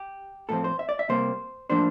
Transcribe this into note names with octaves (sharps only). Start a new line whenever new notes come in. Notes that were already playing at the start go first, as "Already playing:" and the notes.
Already playing: G4
A2 F3 C4 A4
C5
E5
D5
E5
C3 G3 A#3 C5
A2 F3 A#3 D4 C5